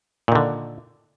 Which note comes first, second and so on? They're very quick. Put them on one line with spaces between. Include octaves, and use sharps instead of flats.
A#2 D#3 D3